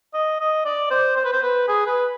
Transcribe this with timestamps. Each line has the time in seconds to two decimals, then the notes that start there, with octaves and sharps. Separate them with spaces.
0.14 D#5
0.40 D#5
0.65 D5
0.91 C5
1.16 C5
1.25 B4
1.33 C5
1.42 B4
1.68 G#4
1.87 B4